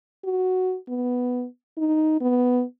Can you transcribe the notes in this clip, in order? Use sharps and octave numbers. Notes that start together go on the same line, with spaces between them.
F#4
B3
D#4
B3